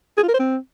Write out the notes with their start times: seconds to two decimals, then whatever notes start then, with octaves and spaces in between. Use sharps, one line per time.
0.17 G#4
0.23 F4
0.28 A#4
0.34 C5
0.39 C4